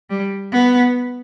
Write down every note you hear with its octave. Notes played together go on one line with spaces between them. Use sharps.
G3
B3